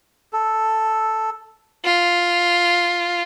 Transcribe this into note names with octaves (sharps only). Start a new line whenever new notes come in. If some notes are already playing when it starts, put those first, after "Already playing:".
A4
F4